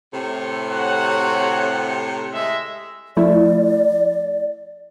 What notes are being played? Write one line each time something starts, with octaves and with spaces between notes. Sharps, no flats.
A2 C3
F#4 C#5 F#5
G#3 D#5 E5
F3 A3 E4 D5